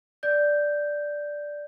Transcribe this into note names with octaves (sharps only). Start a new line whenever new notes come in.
D5 G6